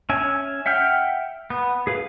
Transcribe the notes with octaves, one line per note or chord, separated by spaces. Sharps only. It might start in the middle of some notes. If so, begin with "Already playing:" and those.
C#4 E5 G#5
E5 F#5 G5 F6
B3
G#4 B4 F5